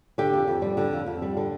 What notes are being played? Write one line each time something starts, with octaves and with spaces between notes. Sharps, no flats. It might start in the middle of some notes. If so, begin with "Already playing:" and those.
D3 G4
F2
F2
G3
D3
F2
F2
G3
D3